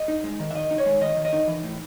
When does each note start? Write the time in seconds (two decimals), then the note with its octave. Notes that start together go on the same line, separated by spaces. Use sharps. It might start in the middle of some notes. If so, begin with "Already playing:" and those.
Already playing: D#5
0.08 D#4
0.24 G#3
0.40 D#3
0.51 E5
0.55 D#3 D#5
0.71 D#4
0.78 C#5
0.86 G#3
1.01 D#3 D#5
1.17 D#3
1.25 D#5
1.33 D#4
1.47 E3
1.64 A2